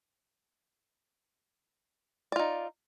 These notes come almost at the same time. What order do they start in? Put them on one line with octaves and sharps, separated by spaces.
D5 F4 D#4